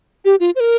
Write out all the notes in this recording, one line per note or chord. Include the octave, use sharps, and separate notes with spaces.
G4
F4
C5
A#4